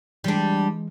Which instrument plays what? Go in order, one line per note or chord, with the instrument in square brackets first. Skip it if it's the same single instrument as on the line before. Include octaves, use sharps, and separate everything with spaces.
[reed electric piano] E3 G#3 [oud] G3 D4